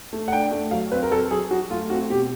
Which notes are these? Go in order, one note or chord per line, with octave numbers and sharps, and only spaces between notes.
A3
F#5
D4 G5
A3
F#3 F5
C4 B4
A#4
F#3 A4
F#3 G#4
F#3 F#4
A3 F4
C4 F#4
B2 G4